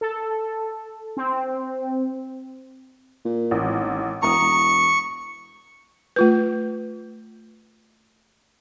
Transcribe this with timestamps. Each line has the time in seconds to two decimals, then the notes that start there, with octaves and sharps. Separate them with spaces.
0.01 A4
1.17 C4
3.25 A#2
3.51 A1
3.63 G#1
4.22 E1 A#5 C#6 D#6
4.40 E1
6.16 A3 F4 B4